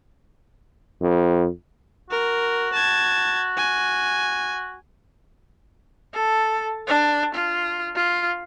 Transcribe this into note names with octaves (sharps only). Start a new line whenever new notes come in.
F2
F#4 A#4
A5 G#6
G#5
A4
D4
F4
F4